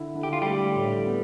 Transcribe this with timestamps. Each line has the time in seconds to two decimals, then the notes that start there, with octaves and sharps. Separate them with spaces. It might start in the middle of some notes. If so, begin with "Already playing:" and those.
Already playing: D3 E4
0.15 D3
0.23 G4
0.33 F4
0.42 G3 A3 G4
0.76 A2
1.06 B3